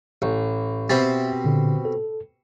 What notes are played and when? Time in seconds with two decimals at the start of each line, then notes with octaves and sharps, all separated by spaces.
0.22 A1
0.90 B2 C4 G4 E5 A6
1.44 A#2 D3
1.85 A4